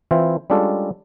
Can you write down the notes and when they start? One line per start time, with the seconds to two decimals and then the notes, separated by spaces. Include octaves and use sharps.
0.11 E3 C4 E4 F4 C5
0.50 G3 G#3 C#4 D4 F4 A4